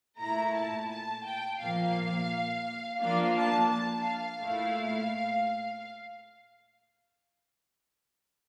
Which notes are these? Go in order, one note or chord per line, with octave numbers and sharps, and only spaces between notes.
A#2 A3 E4 A#5
A5
A5
G5
A#2 F3 A#3 F5
F3 A#3 D4 F4 F5
A5
A5
F5
A#2 A3 E4